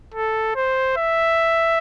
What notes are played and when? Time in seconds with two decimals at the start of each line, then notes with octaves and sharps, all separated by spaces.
0.14 A4
0.55 C5
0.97 E5